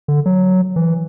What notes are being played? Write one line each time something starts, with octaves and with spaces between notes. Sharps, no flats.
D3
F#3
E3